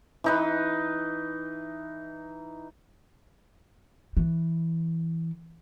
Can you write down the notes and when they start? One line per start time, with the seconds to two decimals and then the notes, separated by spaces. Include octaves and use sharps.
0.24 E3 D#4 B4
4.17 E3